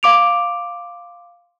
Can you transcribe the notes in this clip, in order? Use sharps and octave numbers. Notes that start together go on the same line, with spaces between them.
F5 C6 D6 D7 F7